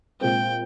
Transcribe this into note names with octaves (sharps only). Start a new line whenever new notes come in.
A#2 G#3 C4 G5